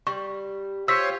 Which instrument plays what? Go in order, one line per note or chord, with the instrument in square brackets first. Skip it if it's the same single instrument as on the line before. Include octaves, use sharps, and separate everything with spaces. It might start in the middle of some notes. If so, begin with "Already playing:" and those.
[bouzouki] G3 [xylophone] C#6
[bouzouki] F4 G4 [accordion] C5 C#5 [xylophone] E6 B6